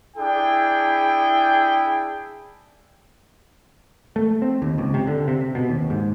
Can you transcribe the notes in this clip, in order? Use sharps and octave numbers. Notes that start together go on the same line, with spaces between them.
D4 E4 G#4 G5
A3
C4
D#2
C#2
C3
D3
C3
B2
D#2
G#2